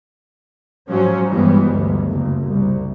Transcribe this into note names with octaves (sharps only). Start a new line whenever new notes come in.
G#2 F3 F#3 C#4
G2 E3 G3 G#3 B3
G1 D2
F#1
C2